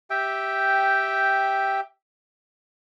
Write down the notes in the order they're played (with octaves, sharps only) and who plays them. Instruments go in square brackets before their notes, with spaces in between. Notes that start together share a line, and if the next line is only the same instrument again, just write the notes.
[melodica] G4 E5 G5